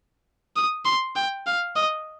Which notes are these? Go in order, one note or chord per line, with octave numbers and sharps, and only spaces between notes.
D#6
C6
G5
F5
D#5